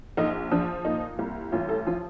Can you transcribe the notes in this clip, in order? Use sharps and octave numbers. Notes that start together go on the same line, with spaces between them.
A#1 D#4
F3 D4
A#2 D#4
C2
A1 F4
A4
F3 F4